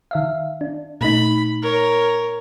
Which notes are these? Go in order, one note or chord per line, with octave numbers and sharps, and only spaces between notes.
D#3 E5 F5
D4
A#2 A3 D#4 B5
A#4 C#5